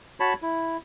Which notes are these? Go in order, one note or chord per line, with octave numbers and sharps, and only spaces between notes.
F#4 C#5 A5 B5
E4